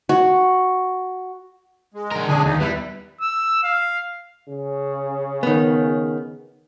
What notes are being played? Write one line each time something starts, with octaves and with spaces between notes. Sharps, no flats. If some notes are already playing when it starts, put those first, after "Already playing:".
F#4
G#3
D4 A#4
D3 G#3 D4 G#4 G#5
D#2 D#4
G3 B3 E4 B4
E6
F5
C#3
D#3 B3